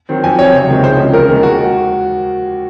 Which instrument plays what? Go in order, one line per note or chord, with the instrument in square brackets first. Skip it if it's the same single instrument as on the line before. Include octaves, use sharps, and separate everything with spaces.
[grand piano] D#3 F#3 C4
F2 G#5
C3 F#3 C4 C#5
C#2
C3 D#3 G#3 C4
F2 C5
C#3 F3 G#3
D#2 A#4
D#3 G#3
F#4